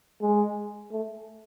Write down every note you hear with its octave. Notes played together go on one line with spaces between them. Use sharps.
G#3
A3